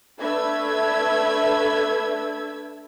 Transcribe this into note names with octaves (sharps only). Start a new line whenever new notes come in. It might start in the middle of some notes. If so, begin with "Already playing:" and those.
A3 D4 B4 E5 E6 G#6